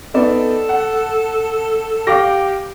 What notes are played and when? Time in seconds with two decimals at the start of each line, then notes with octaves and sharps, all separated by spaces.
0.14 B3 D#4 A4 D5
0.69 F#5
2.07 G4 F5 D6 A#6